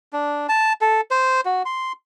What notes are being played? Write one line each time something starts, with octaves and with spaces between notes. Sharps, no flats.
D4
A5
A4
C5
F#4
C6